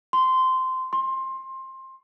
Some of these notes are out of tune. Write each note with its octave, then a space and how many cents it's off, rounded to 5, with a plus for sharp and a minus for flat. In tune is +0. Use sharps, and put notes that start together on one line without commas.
C6 -15
C6 +20